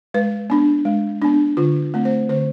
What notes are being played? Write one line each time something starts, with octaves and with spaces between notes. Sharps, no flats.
G#3 B4
B3 D4
G#3
B3 D4
D3 F4
A3 C4
C5
D3 C5